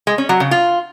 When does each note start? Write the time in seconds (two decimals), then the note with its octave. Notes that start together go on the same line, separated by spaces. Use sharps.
0.07 G#3
0.18 C#4
0.29 F#3
0.40 C#3
0.51 F4